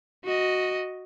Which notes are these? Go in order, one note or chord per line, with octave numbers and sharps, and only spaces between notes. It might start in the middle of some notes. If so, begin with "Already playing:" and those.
F#4 D#5